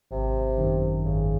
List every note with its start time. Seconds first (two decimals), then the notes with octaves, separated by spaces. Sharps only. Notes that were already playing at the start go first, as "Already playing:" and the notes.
0.11 G#1 C3
0.58 F#2 D#3
1.04 G#1 C#3